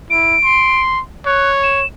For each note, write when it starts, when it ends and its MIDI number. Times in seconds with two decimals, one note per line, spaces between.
0.10 0.36 64
0.10 0.81 98
0.44 1.01 84
1.26 1.83 73
1.26 1.50 90
1.63 1.87 100